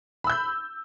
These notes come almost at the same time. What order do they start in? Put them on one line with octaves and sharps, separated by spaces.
B5 E6 G6